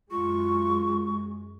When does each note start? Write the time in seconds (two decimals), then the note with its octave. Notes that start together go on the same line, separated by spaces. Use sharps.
0.11 F#2 G#3 F4 C#6